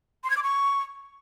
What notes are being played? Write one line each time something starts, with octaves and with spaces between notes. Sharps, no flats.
C6
G#6
D6
C#6